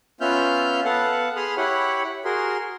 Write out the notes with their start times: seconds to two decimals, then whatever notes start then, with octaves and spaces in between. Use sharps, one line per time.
0.21 B3 C#4 F4 E5 F6 G6
0.85 B3 A4 F5 F#5
1.36 G#4 B5 C6 D#6 F6
1.57 E4 G4 C#5 F#5 B5
2.25 F#4 G#4 A#4 C6